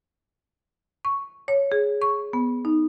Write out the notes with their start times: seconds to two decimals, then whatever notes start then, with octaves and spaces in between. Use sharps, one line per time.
1.05 C#6
1.48 C#5
1.72 G#4
2.02 C#6
2.33 B3
2.65 D#4